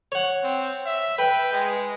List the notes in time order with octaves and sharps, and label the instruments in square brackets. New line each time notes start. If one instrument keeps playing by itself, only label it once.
[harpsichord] C#5 F#5
[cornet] C4
E5
[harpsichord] B4 [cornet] G5
[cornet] G#3